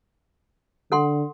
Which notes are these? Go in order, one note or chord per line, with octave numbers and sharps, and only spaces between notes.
D3 A4 F#5 C6